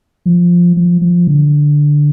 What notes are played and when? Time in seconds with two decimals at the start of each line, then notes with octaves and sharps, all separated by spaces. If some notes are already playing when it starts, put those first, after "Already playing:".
0.26 F3
0.77 F3
1.01 F3
1.27 D3